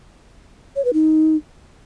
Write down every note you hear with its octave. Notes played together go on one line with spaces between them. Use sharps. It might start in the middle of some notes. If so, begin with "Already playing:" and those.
C#5
B4
D#4